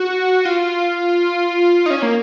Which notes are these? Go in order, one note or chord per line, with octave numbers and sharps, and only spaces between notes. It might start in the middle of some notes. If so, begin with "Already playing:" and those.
Already playing: F#4
F4
D#4
C#4
A#3